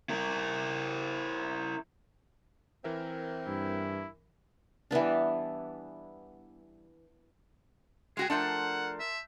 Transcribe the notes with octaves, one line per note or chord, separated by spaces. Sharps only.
E4 A#4
E3 C4 A#4 E5
G2 E4
E3 G3 B3 D4
G#3 F#4 G#4 G5
F3 A3 D4 A#4 F#5 A5 C6 G6
E5